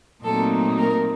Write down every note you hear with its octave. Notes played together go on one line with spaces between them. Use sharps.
A#2 F#3 A3 C4 D#4 A4
A#4